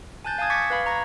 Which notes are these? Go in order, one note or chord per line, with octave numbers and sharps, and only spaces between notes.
G#5 A5 F#6 G6 A6
F5 G#5 A5 D#6 G#6
C#6 D6 G#6 A6 B6 C#7
B4 F5 B5
A#5 C#6 G#6 A#6